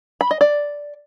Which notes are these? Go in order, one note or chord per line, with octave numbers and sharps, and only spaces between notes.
B5
D#5
D5